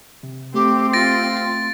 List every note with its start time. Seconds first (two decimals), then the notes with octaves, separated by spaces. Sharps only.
0.23 C3
0.54 A3 C4 G4
0.93 F4 A6 A#6 D7